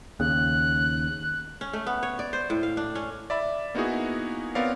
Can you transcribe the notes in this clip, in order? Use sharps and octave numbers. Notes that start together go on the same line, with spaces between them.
D#2 C#3 F#6
C#4
A3
B3
C#5
D5
C5
A2
F5
D4
C#4
D5 E5 B5
A#3 B3 D#4 E4 F#4 G#4
B3 C4 A#4 C#5 D5 F5